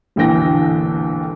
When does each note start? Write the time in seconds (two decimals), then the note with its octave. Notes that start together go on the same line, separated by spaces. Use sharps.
0.16 E1 A#1 D3 E3 G5 A#6